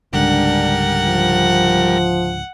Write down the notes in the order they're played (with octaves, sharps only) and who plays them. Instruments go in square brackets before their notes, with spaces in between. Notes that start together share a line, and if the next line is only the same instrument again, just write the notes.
[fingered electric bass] C#2 G#2 D3 [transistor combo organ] G3 A#4 [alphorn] D4 [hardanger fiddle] F#5
[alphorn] F3